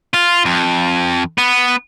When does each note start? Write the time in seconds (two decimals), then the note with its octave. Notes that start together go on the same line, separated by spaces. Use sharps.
0.14 F4
0.45 F2
1.38 B3